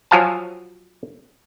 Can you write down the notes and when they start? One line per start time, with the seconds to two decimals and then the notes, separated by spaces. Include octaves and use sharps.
0.11 F3 F#3 F5 G#5 A5